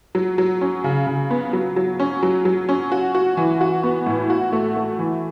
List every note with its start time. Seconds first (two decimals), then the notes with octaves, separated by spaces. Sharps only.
0.15 F#3
0.38 F#3
0.61 C#4
0.84 C#3
1.07 C#3
1.31 B3
1.53 F#3
1.76 F#3
2.00 C#4
2.23 F#3
2.45 F#3
2.69 C#4
2.92 F#4
3.15 F#4
3.37 E3
3.61 F#4
3.83 B3
4.06 A2
4.30 F#4
4.52 A3
4.76 A3
4.99 E3